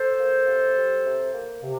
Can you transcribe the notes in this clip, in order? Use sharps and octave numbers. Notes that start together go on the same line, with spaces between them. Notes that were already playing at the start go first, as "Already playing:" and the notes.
Already playing: A4 C5
A#3
C3
G3
C3
A#3
C3